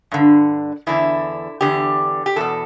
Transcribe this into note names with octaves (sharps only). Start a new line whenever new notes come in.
G2 D3
E2 D3 E4
E2 D3 G4
G4
E2 B2 A4